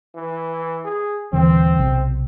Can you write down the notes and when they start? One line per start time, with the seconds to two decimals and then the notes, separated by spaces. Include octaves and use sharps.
0.15 E3
0.85 G#4
1.33 D#1 D3 E3 C4
1.79 B1 C3